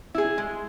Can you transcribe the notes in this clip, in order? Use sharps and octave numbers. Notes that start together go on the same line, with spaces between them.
E4 G#4
G#3